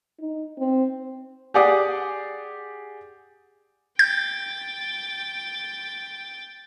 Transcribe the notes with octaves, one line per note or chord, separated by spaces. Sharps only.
D#4
C4
G4 G#4 D5 F#5 D6 D#6
G5 G6 A6